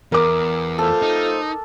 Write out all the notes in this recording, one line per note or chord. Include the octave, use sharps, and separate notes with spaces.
E2 A#4 D6
A3 F4 A4 C5
D#4